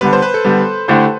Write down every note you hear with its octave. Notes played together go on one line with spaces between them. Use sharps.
D3 G3 B3 B4
C5
B4
A4
D3 G3 B3
D3 A3 E4 G4 C5